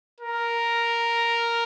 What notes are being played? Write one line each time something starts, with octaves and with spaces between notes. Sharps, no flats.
A#4